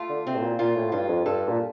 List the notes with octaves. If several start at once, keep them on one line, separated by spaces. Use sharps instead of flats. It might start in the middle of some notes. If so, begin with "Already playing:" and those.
Already playing: A3 F4
D3
C3 C4
A2
A#2
A#2 F4
A2
G2 F4
F2
G2 A4
A#2